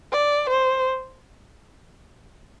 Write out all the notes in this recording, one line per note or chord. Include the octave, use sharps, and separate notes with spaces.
D5
C5